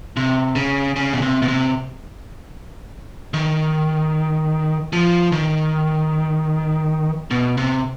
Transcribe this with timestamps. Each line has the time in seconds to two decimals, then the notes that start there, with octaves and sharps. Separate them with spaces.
0.17 C3
0.56 C#3
0.96 C#3
1.13 B2
1.22 C3
1.42 B2
1.48 C3
3.34 D#3
4.93 F3
5.32 D#3
7.31 B2
7.57 C3